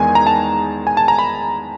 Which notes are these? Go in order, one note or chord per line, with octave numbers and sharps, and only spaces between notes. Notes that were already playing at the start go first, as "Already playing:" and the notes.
Already playing: E2 D#3 G#3 G#5
A#5
A5
G#5
A5
A#5
B5